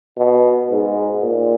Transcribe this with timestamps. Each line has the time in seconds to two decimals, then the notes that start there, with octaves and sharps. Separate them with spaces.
0.17 B2
0.70 G#2
1.22 A#2